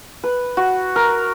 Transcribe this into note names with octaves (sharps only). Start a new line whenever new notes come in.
B4
F#4
A#4